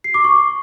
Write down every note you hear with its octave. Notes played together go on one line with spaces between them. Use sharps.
C7
D6
C#6